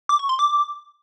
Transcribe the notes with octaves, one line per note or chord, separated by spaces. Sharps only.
D6
C#6
C6
D6